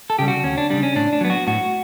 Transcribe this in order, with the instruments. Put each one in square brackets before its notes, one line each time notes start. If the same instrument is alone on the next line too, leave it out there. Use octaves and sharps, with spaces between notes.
[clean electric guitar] A4
C#3 G3 G4
F#4
D2 C#4
D4
C#3 G3 D4
C#4
A2 D4
D4
F#3 B3
F#4
A2 F#4